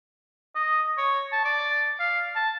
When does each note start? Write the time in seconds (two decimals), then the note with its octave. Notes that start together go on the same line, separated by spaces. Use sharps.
0.56 D#5
0.98 C#5
1.32 A5
1.45 D5
2.00 F5
2.36 A5